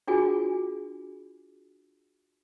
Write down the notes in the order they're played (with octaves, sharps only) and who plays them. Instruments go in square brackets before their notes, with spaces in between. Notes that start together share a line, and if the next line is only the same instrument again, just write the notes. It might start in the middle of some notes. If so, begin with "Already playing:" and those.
[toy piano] D4 F4 F#4 G#4 G#5